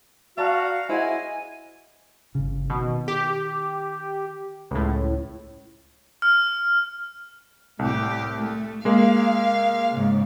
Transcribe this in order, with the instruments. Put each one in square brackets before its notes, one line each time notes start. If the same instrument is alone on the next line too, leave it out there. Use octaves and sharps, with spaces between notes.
[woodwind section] F#4 [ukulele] D5 A5 A#5 [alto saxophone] F5
[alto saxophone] E4 [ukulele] F#4 G#4 C5 [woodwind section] D#5 G#5
[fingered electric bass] G1 C#3
[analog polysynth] B2 [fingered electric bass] D#3
[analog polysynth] G4
C#2 A2
[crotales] F6
[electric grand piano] C2 [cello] A2 G4
[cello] A3
[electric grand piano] G#3 A#3 [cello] F5
[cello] G#2 C#3